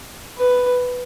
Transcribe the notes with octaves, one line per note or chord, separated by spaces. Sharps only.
B4